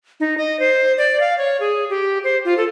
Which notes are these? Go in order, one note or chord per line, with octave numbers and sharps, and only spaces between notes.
D#4
D#5
C5
D5
F5
C#5
G#4
G4
C5
F4
A4